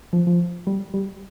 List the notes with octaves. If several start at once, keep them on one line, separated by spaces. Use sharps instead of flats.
F3
F3
G3
G3